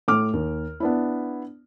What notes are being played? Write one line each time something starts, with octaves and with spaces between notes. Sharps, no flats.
A2 D6 F6
D#2
B3 D4 E4